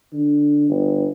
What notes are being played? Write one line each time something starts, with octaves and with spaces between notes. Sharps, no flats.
D3
G1